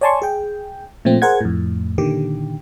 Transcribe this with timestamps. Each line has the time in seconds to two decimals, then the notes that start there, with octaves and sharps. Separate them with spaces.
0.01 C#5 D5 G#5 A5 C6 C#6
0.22 G#4 G5
1.05 A#2 F3 A3 C4
1.22 G#4 A#4 C5 F#5 G#6
1.41 F2 A2
1.98 A#2 D3 D#3 G4